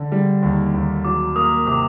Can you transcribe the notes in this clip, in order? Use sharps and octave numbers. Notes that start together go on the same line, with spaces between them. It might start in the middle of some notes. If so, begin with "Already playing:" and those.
Already playing: D3
G3
D#2
D#2
F#3 D6
A#3 D#6
C3 D6